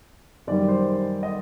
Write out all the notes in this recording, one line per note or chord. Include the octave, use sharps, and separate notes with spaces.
F#2 D#3 G3 D5
C5
D#5